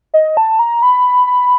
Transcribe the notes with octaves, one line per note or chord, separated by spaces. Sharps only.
D#5
A5
A#5
B5
B5